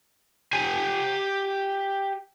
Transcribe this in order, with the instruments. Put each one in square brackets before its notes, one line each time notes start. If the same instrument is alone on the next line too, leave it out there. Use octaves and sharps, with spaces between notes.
[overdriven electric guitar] G4 G#5